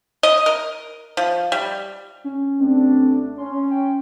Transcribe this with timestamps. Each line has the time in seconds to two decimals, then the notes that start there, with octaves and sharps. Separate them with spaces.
0.23 D#5
0.46 A#4
1.17 F3
1.52 G3
2.24 C#4
2.60 A1 A3 C4 D4
3.38 C#4 C6
3.71 G5